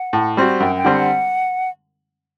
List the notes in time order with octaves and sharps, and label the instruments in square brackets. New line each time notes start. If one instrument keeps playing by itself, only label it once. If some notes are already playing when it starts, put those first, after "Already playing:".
Already playing: [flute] F#5
[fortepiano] A2
G3 C4 F#4
[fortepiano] F#2 [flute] G5
[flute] G5
[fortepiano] D3 G3 C4
[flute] F#5